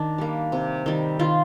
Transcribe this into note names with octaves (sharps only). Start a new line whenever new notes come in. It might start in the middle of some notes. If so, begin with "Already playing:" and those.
Already playing: D#3 D4
G3 A#3
C3
D#3 G3
D#3 F4